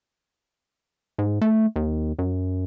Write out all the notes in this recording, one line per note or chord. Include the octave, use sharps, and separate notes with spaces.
G#2
A3
D#2
F#2